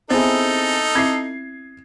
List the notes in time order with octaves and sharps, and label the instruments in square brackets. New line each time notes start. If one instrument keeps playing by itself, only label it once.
[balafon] B3 [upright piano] C4 E4 G#4 [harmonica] D#4 A4
[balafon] C4 E4 E5 [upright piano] G#6 C7